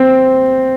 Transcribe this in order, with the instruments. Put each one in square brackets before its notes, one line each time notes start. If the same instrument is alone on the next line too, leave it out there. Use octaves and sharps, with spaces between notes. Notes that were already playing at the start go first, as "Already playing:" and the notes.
Already playing: [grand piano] C4